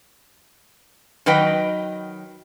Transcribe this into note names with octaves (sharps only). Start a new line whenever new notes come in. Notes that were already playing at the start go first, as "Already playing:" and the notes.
D#3 F#3 B4 D#5 G5